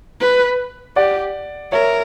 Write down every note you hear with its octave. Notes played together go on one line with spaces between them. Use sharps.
B4
G4 D5 F#5
A#4 C#5 E5